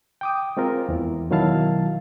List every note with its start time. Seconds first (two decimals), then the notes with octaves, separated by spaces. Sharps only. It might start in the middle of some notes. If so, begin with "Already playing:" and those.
0.21 G5 D6 D#6
0.57 G#3 C4 F4 A#4
0.89 E2 E3
1.30 B2 D#3 F#3 E4 F5 A5